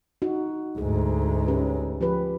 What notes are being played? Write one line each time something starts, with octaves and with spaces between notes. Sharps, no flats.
D#4 F#4
D2 G#2 G#4
C#4 G4 B4
F3 G4 B4